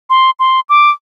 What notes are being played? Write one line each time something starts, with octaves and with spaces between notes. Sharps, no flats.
C6
C6
D6